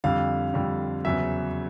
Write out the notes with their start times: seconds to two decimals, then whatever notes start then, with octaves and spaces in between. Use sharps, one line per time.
0.04 F2 D3 G3 F5
0.54 F2 D3 G3
1.05 E2 C#3 F#3 E5